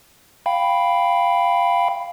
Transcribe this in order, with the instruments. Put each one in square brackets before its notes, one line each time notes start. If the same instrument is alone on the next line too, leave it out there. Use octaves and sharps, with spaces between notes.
[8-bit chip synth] F5 G5 B5